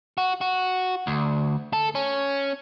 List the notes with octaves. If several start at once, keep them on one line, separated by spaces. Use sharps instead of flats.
F#4
F#4
D2
A4
C#4